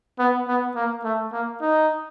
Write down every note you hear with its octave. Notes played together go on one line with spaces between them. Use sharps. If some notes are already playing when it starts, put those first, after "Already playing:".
B3
B3
A#3
A3
A#3
D#4